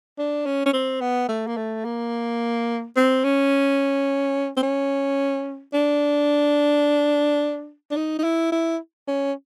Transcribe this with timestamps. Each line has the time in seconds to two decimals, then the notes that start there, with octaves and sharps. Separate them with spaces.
0.18 D4
0.45 C#4
0.66 C#4
0.73 C4
1.01 B3
1.28 A3
1.47 A#3
1.57 A3
1.85 A#3
2.96 C4
3.24 C#4
4.57 C4
4.63 C#4
5.73 D4
7.91 D4
7.96 D#4
8.19 D#4
8.23 E4
8.52 E4
9.07 C#4